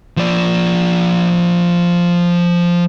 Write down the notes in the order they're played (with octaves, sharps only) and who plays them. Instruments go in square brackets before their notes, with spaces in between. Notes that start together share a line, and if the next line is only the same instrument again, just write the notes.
[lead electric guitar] F3 D5